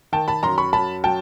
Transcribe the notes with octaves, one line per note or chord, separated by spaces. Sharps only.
D#3 G5 A5
A5 B5
F#2 A#5 C6
B5 C#6
F#2 A5 B5
F#3 G5 A5